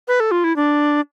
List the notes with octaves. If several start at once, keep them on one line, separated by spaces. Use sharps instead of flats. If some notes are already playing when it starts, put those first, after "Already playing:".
B4
A4
F4
E4
D4